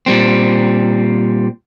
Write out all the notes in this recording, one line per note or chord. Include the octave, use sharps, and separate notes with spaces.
A#2 G3 C4